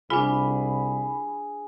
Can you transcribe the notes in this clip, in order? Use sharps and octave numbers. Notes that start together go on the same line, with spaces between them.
C2 D4 F4 G#4 B5